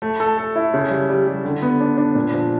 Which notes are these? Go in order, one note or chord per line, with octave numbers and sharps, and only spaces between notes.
A3
A4
A4
E4
C#3
G3
G3
G3
D3
B3
D4
D4
A#2
F3